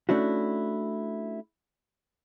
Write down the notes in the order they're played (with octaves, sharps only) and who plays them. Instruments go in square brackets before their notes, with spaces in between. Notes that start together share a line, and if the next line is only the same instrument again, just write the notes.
[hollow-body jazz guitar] A3 C#4 D4 E4 F#4